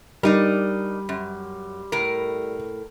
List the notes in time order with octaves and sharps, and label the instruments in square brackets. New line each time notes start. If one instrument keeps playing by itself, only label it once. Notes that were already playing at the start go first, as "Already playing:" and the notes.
[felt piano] G3 [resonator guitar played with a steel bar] D4 D#4 A#4
[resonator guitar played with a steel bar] F#2
A2 A#4